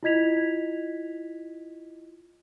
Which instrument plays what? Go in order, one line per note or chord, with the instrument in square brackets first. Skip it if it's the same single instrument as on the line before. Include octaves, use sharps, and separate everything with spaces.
[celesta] E4 F4 D#5 G#6 B6 F7